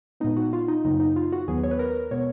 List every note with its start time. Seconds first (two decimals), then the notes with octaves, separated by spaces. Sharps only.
0.20 A#2 G#3 B3 D#4
0.37 F#4
0.53 F4
0.68 D#4
0.85 F#2 C#3 F#3 A#3 D#4
1.00 D#4
1.16 F4
1.32 F#4
1.48 D#2 D#3 F#3 B3 G#4
1.64 C#5
1.71 B4
1.79 A#4
2.11 B2 G#3 B3 C#5